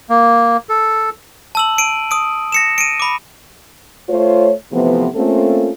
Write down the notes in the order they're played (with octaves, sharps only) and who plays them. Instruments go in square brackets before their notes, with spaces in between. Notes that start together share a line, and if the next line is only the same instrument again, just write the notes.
[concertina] A#3
A4
[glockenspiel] A5 E6 F#7
D7 D#7
D#6 D7
A#6 C#7 E7
D7 D#7
B5 D6
[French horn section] A3 F4 C5 C#5
C3 E3 F3 A3 B3
A3 A#3 C4 C#4 F4 A4